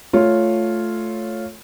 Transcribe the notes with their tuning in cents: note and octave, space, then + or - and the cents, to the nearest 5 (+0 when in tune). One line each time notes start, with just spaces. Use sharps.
A3 +0 F4 +0 C#5 +0